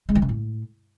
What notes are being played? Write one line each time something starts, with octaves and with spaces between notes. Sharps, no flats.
G#3
E3
C#3
A2